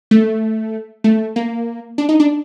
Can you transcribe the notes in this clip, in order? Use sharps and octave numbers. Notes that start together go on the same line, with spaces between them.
A3
A3
A#3
D4
D#4
D4